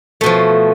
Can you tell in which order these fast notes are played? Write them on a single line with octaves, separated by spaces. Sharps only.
A3 B2 F3